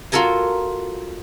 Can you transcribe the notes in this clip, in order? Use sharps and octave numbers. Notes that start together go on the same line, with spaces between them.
F4 F#4 A4 A#4 G#5